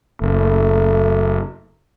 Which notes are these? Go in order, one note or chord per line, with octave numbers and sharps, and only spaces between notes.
F#1 A3